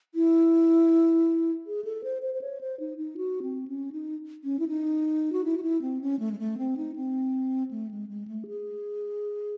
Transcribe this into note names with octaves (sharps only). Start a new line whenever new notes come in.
E4
G#4
A4
C5
C5
C5
C#5
C5
D#4
D#4
F#4
C4
C#4
D#4
C#4
E4
D#4
F#4
E4
F#4
E4
C4
C#4
A3
G#3
A3
C4
D#4
C4
A3
G#3
G#3
A3
G#4